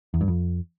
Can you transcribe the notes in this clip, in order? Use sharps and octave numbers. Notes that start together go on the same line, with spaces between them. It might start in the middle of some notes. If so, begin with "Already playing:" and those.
E2
G2
F2